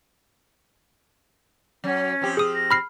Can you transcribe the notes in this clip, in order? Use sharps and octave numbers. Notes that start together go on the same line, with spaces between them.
F#3 C#4
F3 C4 G4
G#4 D#6
A#6
B5 F6 C7